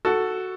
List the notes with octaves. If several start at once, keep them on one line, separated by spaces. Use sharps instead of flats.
F#4 A4